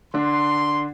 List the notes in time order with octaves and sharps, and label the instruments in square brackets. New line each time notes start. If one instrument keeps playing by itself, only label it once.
[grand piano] D3 D4 [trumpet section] C6